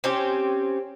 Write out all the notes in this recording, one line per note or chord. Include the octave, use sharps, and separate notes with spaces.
C4 C#4 G4